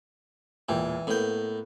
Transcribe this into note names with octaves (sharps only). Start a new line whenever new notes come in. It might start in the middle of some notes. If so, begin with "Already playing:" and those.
E1 A#2 E3 G5
A2 A#3 B3 G5